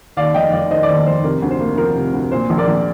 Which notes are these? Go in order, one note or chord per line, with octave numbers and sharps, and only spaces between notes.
D#2 D5 F5
F1 D#5 G5
F1 D5 F5
D#3 C5 D#5
D5
D#2 C5
F1 C5
C3 A#4
D2
C5
A#3
F3 A#4
C3
D2
A#2 C5
A#1
A#4 D5
A#1